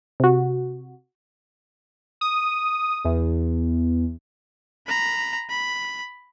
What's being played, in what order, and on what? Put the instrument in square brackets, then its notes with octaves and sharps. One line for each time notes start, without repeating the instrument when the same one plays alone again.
[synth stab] C3 F#4
[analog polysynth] D#6
E2
[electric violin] A#5 B5
B5